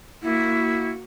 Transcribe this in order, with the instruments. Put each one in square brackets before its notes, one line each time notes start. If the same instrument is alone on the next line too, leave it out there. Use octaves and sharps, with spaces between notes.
[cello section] A#3 F#4 [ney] E4